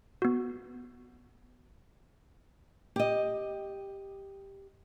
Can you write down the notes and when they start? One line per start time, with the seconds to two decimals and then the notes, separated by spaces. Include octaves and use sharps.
0.22 B3 F#4
2.96 G4 D#5